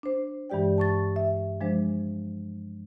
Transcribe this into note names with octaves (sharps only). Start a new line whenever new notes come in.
D4 C5
G2 E3 G#3 G4 D5 G5
A5 C#6 A6
E5
F3 G#3 D4 C5